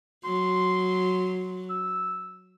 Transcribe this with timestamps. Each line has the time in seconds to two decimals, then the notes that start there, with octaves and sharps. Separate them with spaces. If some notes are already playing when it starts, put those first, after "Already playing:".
0.24 F#3 C6
1.70 E6